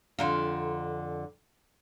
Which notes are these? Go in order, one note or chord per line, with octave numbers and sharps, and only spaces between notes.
F2 D3 F4